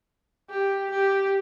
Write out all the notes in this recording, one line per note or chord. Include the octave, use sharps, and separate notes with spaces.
G4
G4